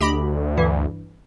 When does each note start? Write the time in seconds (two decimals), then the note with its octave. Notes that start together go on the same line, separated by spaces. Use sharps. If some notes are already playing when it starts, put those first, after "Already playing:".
0.01 D2 G4 D#5 B5
0.57 G2 E3